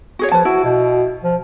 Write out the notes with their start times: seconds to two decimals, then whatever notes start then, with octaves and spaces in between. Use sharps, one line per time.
0.19 F#4 G#4 C#5
0.32 F3 B4 A5
0.45 E4 F#4
0.64 B2
1.23 F3